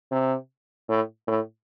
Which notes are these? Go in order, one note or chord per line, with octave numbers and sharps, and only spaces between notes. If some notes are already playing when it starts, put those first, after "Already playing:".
C3
A2
A2